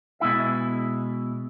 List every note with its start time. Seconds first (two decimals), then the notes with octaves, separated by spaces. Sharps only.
0.20 B2 G#3 E4 E5